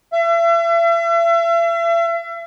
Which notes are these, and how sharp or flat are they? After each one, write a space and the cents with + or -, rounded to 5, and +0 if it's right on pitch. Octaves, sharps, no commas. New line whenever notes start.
E5 +40